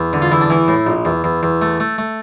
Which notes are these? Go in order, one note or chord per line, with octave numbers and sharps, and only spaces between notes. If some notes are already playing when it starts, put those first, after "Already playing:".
Already playing: E2
D3
F4
E2 E4
D4
E3 E4
A2
A#1
E2
E2
E2
A3
A3
A3